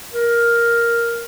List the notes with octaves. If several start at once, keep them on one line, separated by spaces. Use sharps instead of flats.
A#4